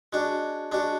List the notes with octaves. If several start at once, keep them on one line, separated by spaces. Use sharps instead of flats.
G#3 D4 F#4
G#3 D4 F#4